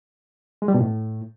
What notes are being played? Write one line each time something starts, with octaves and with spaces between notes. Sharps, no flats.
G#3
G3
B2
A2